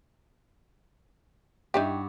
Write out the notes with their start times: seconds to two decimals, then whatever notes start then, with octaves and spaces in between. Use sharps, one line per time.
1.74 G2 D#4 E4 F#4 G4